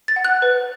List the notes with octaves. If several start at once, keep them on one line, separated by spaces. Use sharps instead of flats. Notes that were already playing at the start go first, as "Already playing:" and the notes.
A6
F#5
F#6
B4